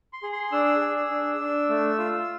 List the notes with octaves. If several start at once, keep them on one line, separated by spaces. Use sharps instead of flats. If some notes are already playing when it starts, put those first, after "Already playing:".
C6
G#4
C6
D4 E6
G#4
D4
D4
A3
F4